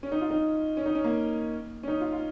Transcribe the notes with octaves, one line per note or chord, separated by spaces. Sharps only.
C#4
D#4
F4
D#4
C#4
D#4
C#4
A#3
C#4
D#4
F4
F4